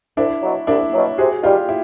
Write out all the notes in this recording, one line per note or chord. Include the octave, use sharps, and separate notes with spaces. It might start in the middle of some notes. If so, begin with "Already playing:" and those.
C2 D4 E4
B2 F#3
C2 D4 E4
B2 F#3
C3 F#4 G#4
D#3 G3 F4 G4
E4